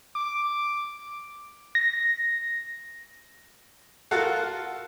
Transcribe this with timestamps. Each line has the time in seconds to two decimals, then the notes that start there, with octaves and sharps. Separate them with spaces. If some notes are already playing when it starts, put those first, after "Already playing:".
0.15 D6
1.75 A#6
4.11 F4 F#4 A4 A#4 F5 F#5